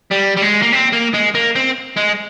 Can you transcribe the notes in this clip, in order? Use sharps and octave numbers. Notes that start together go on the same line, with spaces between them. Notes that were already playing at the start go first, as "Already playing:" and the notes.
G3
G3
G#3
A#3
C4
A#3
G#3
A#3
C4
G#3